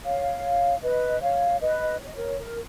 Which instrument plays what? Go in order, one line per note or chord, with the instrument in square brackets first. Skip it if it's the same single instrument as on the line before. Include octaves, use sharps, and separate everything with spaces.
[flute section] C#5 F5
B4 D#5
C#5 F5
B4 D#5
C#5
D#5
A#4 C#5
A#4